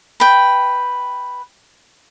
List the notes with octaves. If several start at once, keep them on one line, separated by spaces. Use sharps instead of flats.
B4 G5